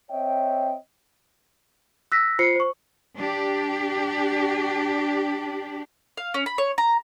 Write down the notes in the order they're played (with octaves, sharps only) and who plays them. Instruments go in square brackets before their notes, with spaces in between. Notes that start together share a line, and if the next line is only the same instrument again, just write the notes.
[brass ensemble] C4 C#5 D#5 E5 G5
[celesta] E6 F#6 A#6 B6
F4 C5 C7 C#7
C5 C#6
[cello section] D4 G4
[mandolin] F5
C#4
B5
C#5
A#5